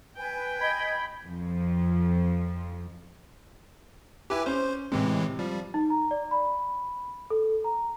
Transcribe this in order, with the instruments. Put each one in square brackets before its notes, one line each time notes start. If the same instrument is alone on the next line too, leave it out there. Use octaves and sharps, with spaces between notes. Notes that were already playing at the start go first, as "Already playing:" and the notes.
[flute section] B4 G#5 [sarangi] G5
[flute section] D#5 G#5 G#6 [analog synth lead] B5
[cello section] F2 F3
[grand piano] E4 D6 [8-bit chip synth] G4 B4 G#5
[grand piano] C#4 C6 [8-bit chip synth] C5
[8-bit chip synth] A2 E3 G#3 [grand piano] C3
[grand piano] F3 [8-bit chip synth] G3
[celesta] D#4
A#5
D5
B5
A4
A#5